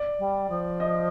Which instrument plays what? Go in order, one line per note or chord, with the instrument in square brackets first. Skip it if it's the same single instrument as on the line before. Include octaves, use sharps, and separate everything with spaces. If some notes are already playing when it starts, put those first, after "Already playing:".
Already playing: [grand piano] D5
[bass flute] G3
F3
[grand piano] D#5